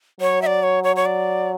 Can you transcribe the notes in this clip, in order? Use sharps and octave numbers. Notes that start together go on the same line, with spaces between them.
F#3 C#5
E5
D5
C#5
C#5
C#5
D5